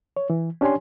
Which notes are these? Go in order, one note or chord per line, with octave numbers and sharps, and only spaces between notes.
C#5
E3
C#4 D4 G4 C#5 G#5 C6